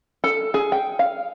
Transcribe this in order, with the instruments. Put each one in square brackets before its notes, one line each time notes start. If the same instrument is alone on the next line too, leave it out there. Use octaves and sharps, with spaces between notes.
[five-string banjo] A4
G#4
G5
F5